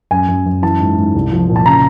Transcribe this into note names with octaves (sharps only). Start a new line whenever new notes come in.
F#2 G#5
F#2
F#2
E3 A5
G#2
G#2
C2
F3
A#2
A5
C#3 A#5